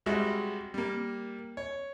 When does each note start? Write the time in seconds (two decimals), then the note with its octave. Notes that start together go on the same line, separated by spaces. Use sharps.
0.06 C2 G3 G#3 F#4 E5
0.74 G3 A#3
1.57 C#5